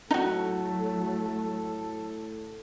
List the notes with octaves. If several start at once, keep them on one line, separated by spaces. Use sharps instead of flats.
A2 F#3 A3 D#4 F#4 A4